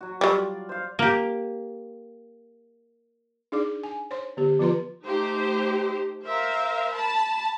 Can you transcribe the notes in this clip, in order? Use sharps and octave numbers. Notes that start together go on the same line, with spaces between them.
F#3 F#4
F#3 G3 F4 D5
C5 F5
A#3 G4
D4 D#4 G#4 D5 D6
G#5
C5 C#5 C6
D3 B3 G4
F3 B3 F4 B4 A#5 C6
A3 D#4 G4 C5
A#4 C5 E5 F5
A5 B5